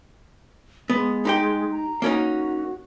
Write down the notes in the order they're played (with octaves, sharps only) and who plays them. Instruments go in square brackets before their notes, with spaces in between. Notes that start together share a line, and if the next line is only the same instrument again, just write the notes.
[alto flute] G#3 [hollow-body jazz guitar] B3
[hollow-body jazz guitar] D#4 G4 G5
[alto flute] A#5
[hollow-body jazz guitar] A#3 C#4 D#4 [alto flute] F#4